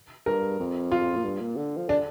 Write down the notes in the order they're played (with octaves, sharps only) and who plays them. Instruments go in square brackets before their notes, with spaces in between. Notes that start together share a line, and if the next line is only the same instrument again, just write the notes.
[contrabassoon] G2 [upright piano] A#4
[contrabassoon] F2
[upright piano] F4
[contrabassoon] A#2
G2
A#2
D3
F3
[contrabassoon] D3 [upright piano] D4